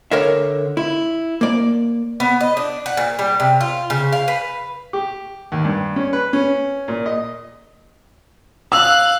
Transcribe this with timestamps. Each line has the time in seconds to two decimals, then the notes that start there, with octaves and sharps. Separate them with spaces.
0.11 D3 A#4 C#5 E5
0.77 E4
1.41 A#3 D5
2.20 B3
2.41 D#5
2.57 D4
2.86 F#5
2.97 A#2
3.19 G3
3.40 C3
3.61 F4
3.90 C#3
4.12 F5
4.28 B4
4.93 G4
5.52 D#2
5.65 G2
5.96 C#4
6.13 B4
6.33 C#4
6.88 A#2
7.06 D#5
8.72 F5 E6 F#6